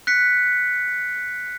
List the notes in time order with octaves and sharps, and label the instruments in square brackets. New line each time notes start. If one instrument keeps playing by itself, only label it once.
[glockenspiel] F#6 B6 C#7